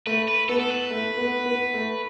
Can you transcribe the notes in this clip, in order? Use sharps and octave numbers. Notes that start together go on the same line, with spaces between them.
A3 B4
B4
B3 A4
A4
B4
A3
B3
B3
A3